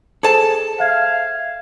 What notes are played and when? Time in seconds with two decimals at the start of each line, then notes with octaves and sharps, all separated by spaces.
0.23 G#4 A4 C5 A5
0.80 E5 F5 G#6